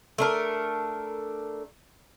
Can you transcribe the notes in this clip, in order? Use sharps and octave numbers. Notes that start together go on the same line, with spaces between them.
A3 D4 A#4